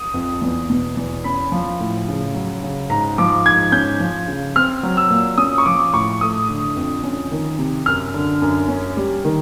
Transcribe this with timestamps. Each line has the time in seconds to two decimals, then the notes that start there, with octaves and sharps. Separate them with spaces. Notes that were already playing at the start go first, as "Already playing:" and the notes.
Already playing: D#6
0.14 F2
0.41 E2
0.70 B2
0.97 E2
1.24 C#4 B5
1.52 F3
1.80 A2
2.08 C#3
2.34 F#3
2.63 C#3
2.90 G#2 A#5
3.18 F3 D6
3.45 G#2 G#6
3.72 C#4 G6
4.00 F3
4.27 C#3
4.56 C4 F6
4.83 F#3
4.97 E6
5.10 A#2
5.38 C#4 D#6
5.58 C#6
5.66 F3 D6
5.93 A2 C#6
6.21 A3 D#6
6.48 D3
6.77 F2
7.04 C#4
7.32 D#3
7.58 C3
7.86 F#2 F6
8.14 D3
8.42 F#2
8.68 C#4
8.97 G3
9.24 D#3